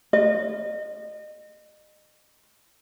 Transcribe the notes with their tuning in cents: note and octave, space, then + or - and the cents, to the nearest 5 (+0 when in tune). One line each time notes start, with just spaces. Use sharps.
D#5 -30